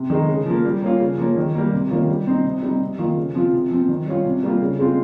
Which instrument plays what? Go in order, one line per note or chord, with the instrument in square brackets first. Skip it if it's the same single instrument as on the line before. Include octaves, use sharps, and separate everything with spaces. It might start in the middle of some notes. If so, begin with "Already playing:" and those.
Already playing: [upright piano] C3
D#3 G#3 D#4
C#3
F3 A#3
G3
A#3 C#4 F4
C#3
F3 A#3 C#4
D#3
G3 A#3
C3
D#3 A#3 C#4 F4
G3
C4 D#4
C3
G3 C4 D#4
C3
D#3 A#3 F4
C#3
F3 C4 F4
C3
F3 C4
D#3
G3 C#4 F4
C3
G3 A#3 F4
C#3
G#3 C4 F4